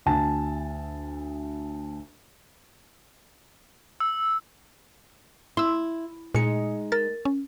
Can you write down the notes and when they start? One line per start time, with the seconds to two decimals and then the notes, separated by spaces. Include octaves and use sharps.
0.06 D2 G#5 A5
4.00 E6
5.57 E4 C6 E6
6.35 A#2 G#3 D#4 C#7
6.92 A#4 A6
7.25 C#4